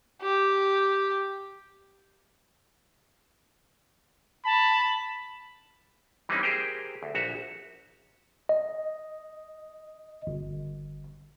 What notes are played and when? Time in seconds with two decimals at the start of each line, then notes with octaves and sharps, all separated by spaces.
0.22 G4
4.46 A5 B5
6.29 E3 G3 A#3 C4 C#4 D#4
6.43 G4 G#4 A#4 C5 G5
7.03 D2
7.15 A#1 F#4 E5 A#5
8.49 D#5
10.27 G1